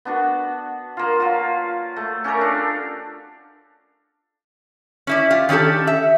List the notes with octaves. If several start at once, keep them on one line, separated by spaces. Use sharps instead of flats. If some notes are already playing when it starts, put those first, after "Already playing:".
B3 D4 F#4
A#3 F4
F#3 F4
A3
C#4 G4 A4 A#4
D4
C#4 E4 D5
F4 G4
D#3 C#4 D4 G4 A4
E5